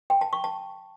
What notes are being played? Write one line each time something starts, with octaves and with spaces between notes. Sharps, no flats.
G5
A5
C#6
A5